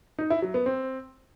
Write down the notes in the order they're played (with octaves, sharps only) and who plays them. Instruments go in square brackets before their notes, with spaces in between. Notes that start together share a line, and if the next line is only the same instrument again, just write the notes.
[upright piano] D#4
E4
F#3
B3
C4